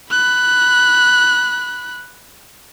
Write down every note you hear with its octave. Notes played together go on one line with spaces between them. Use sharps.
B5 F#6